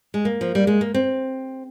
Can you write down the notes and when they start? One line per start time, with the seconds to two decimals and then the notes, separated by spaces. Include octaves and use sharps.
0.14 G#3
0.25 A#3
0.41 F3
0.55 G3
0.67 G#3
0.81 A#3
0.94 C4